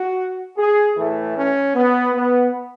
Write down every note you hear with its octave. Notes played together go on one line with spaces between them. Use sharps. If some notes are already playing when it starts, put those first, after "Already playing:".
Already playing: F#4
G#4
A2 E3 A3
C#4
B3
B3